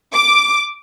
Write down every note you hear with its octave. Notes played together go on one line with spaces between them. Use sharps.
D6